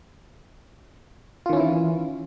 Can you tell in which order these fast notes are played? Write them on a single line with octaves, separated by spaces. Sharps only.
F4 D#3 C#4 E4 E3